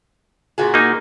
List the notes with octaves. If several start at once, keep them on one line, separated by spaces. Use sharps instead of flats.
A#2 F#4 G#4
A#3 D#4